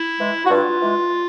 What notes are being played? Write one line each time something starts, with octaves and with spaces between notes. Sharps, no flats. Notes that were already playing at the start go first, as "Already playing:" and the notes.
Already playing: E4
E3 G#3
F#4
G2 F4
E3 G#3